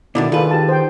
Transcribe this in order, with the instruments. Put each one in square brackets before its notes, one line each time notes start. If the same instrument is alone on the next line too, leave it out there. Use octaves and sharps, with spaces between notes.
[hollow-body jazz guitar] B2 D3 D#3 [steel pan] E4 D5
[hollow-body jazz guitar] D#3 B4 [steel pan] F4 G#4 A4
[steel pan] G4 A5
C5 G5